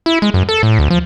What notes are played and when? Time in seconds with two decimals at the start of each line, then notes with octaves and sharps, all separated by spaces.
0.06 E4
0.22 G#3
0.34 F#2
0.49 A4
0.63 A2
0.79 D2
0.90 F3